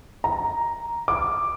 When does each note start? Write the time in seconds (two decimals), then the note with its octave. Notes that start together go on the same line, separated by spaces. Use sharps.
0.24 A#5
1.08 D6